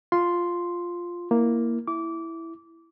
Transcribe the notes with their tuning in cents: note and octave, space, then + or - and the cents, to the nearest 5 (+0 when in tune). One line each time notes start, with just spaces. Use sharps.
F4 +0 C6 +0
A#3 +0 E4 +0
E4 +0 D6 -20